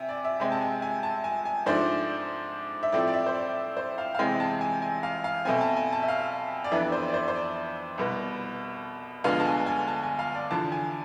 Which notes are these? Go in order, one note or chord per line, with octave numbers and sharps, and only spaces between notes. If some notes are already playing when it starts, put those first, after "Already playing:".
Already playing: C3 E5 G#5
D5
E5
C3 G#3 C4 E5
A5
G#5
G#5
A5
G#5
G#5
G#2 F3 A3 D4 C5
E5
A2 F3 A3 C4 D5
D5
E5
C5
D5
C5
F5
F5
E2 C3 E3 G#3 C4 G#5
A5
G#5
G#5
F5
F5
B2 A3 C4 G#5
A5
G#5
A5
E5
F5
D5
F2 E3 B3 D4 E5
C5
D5
C5
C5
D5
C2 B2 B3
D2 D3 F3 G#3 B3 F5
A5
G#5
G#5
A5
G#5
F5
D5
E2 D3 F3 A5
G#5